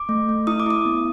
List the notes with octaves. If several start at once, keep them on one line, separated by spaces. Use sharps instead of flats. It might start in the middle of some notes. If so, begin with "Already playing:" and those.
Already playing: D6
A3
A3
E4 D#6
D6
E4 D#6
B3